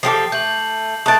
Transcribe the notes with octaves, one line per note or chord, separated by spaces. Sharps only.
F3 G4 A4 D6 C7
A3 G6 F#7
A3 A5 D#6 F#6 D7